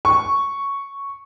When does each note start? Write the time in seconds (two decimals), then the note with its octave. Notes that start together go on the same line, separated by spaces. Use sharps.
0.05 C#6